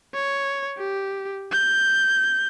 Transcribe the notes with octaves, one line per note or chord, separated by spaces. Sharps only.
C#5
G4
G6